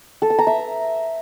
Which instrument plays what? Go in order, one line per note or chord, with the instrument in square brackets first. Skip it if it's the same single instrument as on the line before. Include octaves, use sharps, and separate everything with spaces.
[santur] A4
A5
A#5
E5